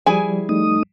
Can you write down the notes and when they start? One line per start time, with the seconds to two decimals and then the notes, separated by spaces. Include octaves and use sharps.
0.06 F3 G3 E4 G#4 G#5
0.49 A3 D#4 D#6